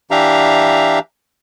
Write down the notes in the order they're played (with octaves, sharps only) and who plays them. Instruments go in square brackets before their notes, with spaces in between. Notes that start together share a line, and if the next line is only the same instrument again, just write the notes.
[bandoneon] E3 D4 G4 E5 F5 A#5